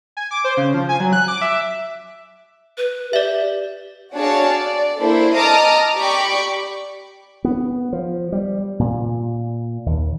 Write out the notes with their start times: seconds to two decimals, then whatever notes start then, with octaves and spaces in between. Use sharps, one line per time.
0.17 G#5
0.31 D6
0.44 C5
0.57 C#3
0.74 F3
0.89 G#5
1.00 F#3
1.13 F#6
1.28 D6
1.42 E5
2.78 B4
3.13 G4 D5 E5
4.15 D4 F#4 G#4 C#5 F5 A5
4.49 D5
4.99 A#3 D4 E4 A4 C5
5.35 D#5 A5 A#5 D6 D#6 F6
5.97 G4 D5 B5 C#6 D6
7.44 B3
7.93 F3
8.32 G3
8.79 A#2
9.86 D#2